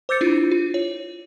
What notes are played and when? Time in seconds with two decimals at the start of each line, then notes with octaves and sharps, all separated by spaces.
0.09 C5 D6 E6 G6 A6 C#7
0.21 D4 E4 F4
0.51 F4
0.74 C#5